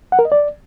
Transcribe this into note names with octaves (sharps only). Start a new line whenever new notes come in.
F#5
A#4
D#5
D5